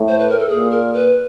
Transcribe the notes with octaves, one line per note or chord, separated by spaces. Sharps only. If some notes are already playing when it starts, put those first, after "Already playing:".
Already playing: A2
C5
B4
A#4
A4
A#2 G#4
A#4
B4